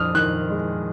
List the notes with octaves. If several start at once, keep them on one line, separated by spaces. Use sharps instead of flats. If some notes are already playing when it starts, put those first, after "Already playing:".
Already playing: F2 D4 D#6 F6
D#3 F#6
G#3